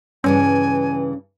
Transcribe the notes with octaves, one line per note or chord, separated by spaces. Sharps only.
G2 C#3 E3 C#4 G#5